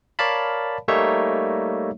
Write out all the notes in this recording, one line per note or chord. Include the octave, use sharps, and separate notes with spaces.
A#4 C#5 D5 F5 A5 B5
G3 A3 A#3 D#4 C#5 E5